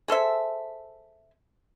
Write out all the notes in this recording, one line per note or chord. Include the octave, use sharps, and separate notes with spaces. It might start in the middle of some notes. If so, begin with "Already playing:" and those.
G#4 A4 C5 E5